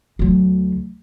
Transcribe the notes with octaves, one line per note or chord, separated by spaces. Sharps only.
D2 F#3